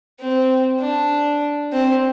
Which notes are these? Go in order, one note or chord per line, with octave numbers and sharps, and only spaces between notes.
C4
D4
C4